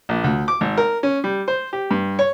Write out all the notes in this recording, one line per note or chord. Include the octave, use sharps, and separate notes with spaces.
A#1
D2
D6
G#1
A#4
C#4
G3
C5
G4
G2
C#5